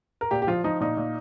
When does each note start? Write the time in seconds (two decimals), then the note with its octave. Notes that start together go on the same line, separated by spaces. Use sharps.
0.21 A#4
0.31 A#2 G4
0.42 G4
0.47 F3 F4
0.64 F3 D#4
0.80 A#2 D#4
0.97 A#2